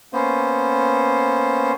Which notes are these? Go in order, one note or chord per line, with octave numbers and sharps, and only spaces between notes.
A#3 B3 C#4 C5